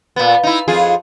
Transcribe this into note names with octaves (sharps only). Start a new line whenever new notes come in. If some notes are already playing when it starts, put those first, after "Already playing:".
A#2 B3
D#4 E4
F2 F4 G#4